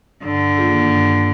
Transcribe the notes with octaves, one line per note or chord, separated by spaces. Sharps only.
G2 D3
D#3 A#3 F4 G#4
G2